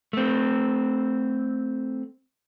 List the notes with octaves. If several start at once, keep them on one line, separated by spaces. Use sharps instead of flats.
A3 C4